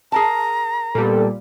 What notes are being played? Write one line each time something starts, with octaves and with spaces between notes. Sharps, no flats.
G#4 A#4 A5 A#5
A#2 G3 B3 G4 A4